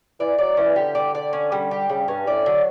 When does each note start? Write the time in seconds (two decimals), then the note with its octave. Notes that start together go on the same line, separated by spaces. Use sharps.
0.19 E3 D5
0.39 F#3 D5
0.57 E3 C#4
0.76 D3 G4
0.95 D5
1.15 D5
1.33 C#4
1.52 G3
1.71 G4
1.89 C#3 G3
2.08 G2 C#4
2.27 A2 D5
2.46 D3 F#3